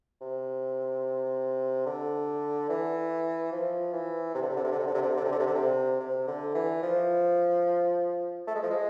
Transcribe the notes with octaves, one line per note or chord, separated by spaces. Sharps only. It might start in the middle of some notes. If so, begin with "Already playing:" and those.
C3
D3
E3
F3
E3
C3
D3
C3
D3
C3
D3
C3
D3
C3
D3
C3
D3
C3
D3
C3
D3
C3
C3
D3
E3
F3
A3
G#3
F3
G#3